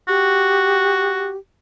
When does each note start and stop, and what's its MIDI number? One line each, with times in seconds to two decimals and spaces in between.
0.08 1.32 66
0.08 1.37 67